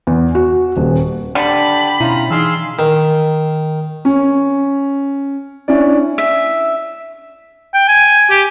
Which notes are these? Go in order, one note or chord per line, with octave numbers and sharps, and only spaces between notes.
E2
F#4
D#1
D3 G4 D5 G5 A5 B5
B2 C#4 E4 F4 A#5
E3 D#4 G#4 F5 C6 E6
D#3
C#4
C#4 D4 E4 D5
E5
G5
G#5
G4